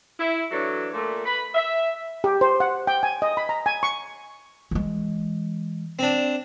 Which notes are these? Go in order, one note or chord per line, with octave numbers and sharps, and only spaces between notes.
E4
E3 F#3 D4 A4 C#5
A#2 A3
B4 B5
E5
G4
C5
F#5
G5
G#5
D#5
B5
A#5
G#5
C#6
E3 G#3
C4 D4